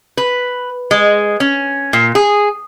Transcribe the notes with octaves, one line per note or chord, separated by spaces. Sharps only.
B4
G#3
C#4
A#2
G#4